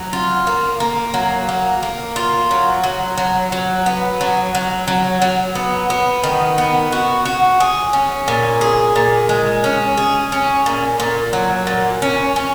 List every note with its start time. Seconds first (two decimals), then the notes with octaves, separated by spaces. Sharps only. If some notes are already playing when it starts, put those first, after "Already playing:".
Already playing: F#3
0.13 F4
0.47 A#3
0.80 A#3
1.14 F#3
1.49 A#3
1.83 A#3
2.16 F4
2.51 F#3
2.84 F#3
3.18 F#3
3.52 F#3
3.86 B3
4.21 F#3
4.55 F#3
4.88 F#3
5.22 F#3
5.55 B3
5.90 B3
6.24 D#3
6.58 B3
6.92 F#4
7.25 F#4
7.60 G#4
7.93 C#4
8.28 A#2
8.61 G#4
8.96 A#2
9.29 G#3
9.64 C#4
9.97 G#4
10.32 C#4
10.66 A#2
11.00 A#2
11.33 F#3
11.67 A#2
12.02 C#4
12.36 C#4